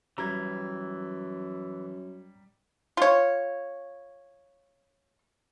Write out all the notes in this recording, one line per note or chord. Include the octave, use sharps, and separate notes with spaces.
F#2 E3 G3 A#5 G#6
F4 C#5